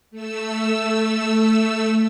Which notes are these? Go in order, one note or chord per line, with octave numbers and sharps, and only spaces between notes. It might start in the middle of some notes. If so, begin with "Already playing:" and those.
A3 E6